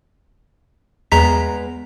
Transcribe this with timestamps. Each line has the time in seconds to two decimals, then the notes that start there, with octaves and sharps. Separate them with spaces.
1.12 E2 G#3 B3 A#5 B6